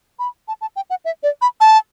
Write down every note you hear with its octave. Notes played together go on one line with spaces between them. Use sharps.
B5
A5
A5
G5
F#5
E5
D5
B5
A5